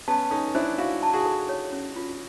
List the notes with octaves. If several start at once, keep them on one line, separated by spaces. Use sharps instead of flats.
B3 C#4 A5
C#4 D#4 A4
D4 E4 C5
E4 F#4 F5
A5
F#4 G#4
A4
C#5
C#4
F4